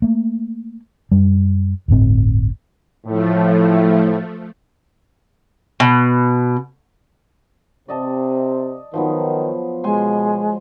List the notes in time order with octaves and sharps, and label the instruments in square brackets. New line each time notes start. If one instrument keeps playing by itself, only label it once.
[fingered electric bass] A3 A#3
F#2 G3
D1 G1 A2 C4
[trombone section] A2 [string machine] F3 A3
[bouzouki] B2
[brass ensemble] C3 C4 [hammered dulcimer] D5 D#5 A5
[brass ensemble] D#3 [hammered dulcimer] F3 F#3 B3
[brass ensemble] B2 [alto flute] G#3 [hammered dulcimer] C5 G#5 C6